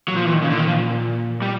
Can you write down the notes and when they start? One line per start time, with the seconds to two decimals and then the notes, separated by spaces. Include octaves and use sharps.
0.08 A#2 F#3
0.17 F3
0.25 E3
0.33 D#3
0.42 A#2 C#3
0.50 D3
0.58 D#3
0.67 F3
1.42 G3